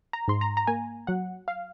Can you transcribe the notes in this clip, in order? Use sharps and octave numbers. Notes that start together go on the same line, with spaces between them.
A#5
G#2 C6
A#5
A#5
A#3 G#5
F#3 F#5
F5